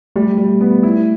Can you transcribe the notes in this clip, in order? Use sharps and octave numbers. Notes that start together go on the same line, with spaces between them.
G3 A3
G3
B3
E4